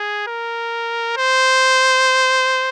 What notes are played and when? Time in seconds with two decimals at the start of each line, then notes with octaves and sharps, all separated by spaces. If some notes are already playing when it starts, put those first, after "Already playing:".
Already playing: G#4
0.27 A#4
1.17 C5